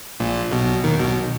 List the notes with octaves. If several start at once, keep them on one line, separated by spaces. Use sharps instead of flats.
A#1 A#2
B1 B2
D#2 D#3
B1 B2